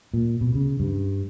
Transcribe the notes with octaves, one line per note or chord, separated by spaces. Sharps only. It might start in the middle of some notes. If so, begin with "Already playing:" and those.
A#2
B2
C#3
G2